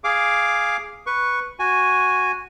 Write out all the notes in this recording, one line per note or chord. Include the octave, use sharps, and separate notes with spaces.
G#4 F5 D6
B4 C#6
F#4 G#5